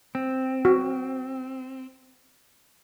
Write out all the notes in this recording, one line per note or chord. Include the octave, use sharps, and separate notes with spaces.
C4
F#4